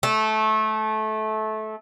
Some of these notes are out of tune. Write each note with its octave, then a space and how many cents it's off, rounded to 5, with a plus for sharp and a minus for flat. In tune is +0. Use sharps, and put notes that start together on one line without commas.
A3 -20